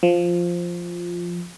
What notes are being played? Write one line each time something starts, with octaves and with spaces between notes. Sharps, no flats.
F3